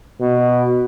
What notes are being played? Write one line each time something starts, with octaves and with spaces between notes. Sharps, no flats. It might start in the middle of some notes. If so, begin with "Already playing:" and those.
B2